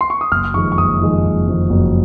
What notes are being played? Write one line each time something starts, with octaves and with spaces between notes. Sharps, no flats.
C6
C#6
D#6
F#1 F6
F2 D#3 G#3 C#6
C#6
F#1 D#6
F2 D#3 G#3
F#1
F2 D#3 G#3
F#1